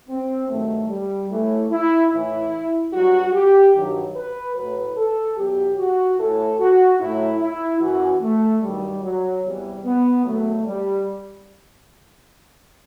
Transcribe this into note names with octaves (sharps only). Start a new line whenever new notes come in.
C4
G2 D#3 F#3 A3
G3
A2 E3 A3
E4
A2 E3 E4
G2 F#3 F#4
G4
G2 D#3 F#3
B4
A2 F#3 B4
A4
E2 B2 F#3 G4
F#4
A2 E3 A4
F#4
A2 F#3 E4
E4
F#2 E3 F#4
A3
G2 D#3 F#3 G3
F#3
E2 C3 E3 G3
B3
E2 D#3 F#3 A3
G3